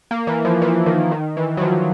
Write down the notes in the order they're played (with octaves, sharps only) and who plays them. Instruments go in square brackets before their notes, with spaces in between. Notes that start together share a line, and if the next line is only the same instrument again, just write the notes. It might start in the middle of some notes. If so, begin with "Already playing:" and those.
[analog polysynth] A#3
E3
F3
E3
D#3
D#3
E3
F#3
F3